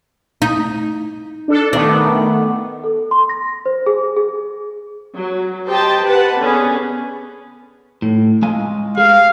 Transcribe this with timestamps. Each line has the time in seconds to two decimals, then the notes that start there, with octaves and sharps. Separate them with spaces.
0.42 D#4
1.48 D4 A4
1.73 D#3 A3 B3 D4
2.84 A4
3.11 C6
3.29 A#6
3.66 C5
3.86 G#4
4.16 G#4
5.14 F#3
5.66 G4 C5 D#5 G5 A5
6.05 B4 F#5 A5 B5
6.38 D3 B3 C#4 G#4
8.02 A2
8.42 G#3 F5 G#5
8.98 G#4 F5